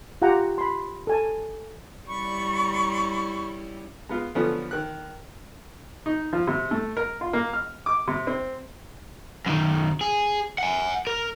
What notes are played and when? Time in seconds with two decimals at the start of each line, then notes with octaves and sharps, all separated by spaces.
0.22 F4 G4 F#5 G5 A#5
0.58 B5 C6
1.07 A4 G#5 A5
2.08 G3 C#4 E4 D5 B5 C#6
4.09 G#3 B3 F4
4.35 D3 F3 F#3 A3 B3 C#4
4.71 D#3 F#6
6.06 D#4
6.33 F3
6.47 C3
6.71 A3
6.97 A#4
7.21 F4
7.33 A#3
7.53 F6
7.86 D6
8.08 C3
8.27 C4
9.46 F#2 D#3
10.01 G#4
10.58 F#5 G#5
11.07 A#4